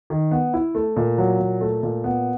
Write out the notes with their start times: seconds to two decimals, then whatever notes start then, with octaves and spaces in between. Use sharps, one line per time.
0.10 D#3
0.31 B3
0.53 E4
0.75 A3
0.96 A#2
1.18 F#3
1.39 A#2
1.61 A3
1.83 A#2
2.04 B3